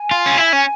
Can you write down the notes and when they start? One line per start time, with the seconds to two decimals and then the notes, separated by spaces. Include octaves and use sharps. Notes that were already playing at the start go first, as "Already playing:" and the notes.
Already playing: G#5
0.11 F4
0.26 C#4
0.38 E4
0.53 C#4